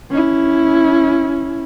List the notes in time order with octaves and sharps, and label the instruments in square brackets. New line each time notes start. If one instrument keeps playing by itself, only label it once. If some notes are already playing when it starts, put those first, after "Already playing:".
[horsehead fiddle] C#4 E4